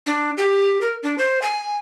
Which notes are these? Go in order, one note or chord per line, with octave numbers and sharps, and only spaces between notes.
D4
G4
A#4
D4
C5
G#5